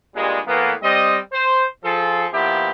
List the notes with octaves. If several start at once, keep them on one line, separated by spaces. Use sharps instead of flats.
G2 A#2 G3 G#3
A2 E3 A#3 B3
G3 C4 D#5
C5
F3 G#4 A4
A#2 F3 B3 E4 G4